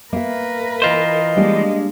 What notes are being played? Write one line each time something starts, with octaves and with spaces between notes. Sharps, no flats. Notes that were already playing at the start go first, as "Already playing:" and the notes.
A#3 A#4 B4 E5
E3 F4 C5 D#5
G3 G#3 A#3 D4